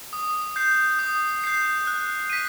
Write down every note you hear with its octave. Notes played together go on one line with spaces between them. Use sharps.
D#6
G6 C7
D#6
G6 C7
F#6
B6 D#7